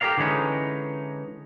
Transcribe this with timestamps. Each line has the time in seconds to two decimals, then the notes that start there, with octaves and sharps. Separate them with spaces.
0.01 G4 A4 A#4 D5 F5
0.17 D3 E3 G#3 C#4 D#4